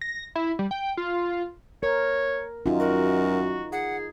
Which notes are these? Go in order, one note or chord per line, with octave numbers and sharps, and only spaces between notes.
A#6
E4
G3
G5
F4
A#4 C#5
F#2 D#4 F4
F#4 A#4
G#4 F#5